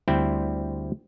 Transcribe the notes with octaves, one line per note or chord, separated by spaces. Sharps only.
D2 G3 C4 E4 C5 G5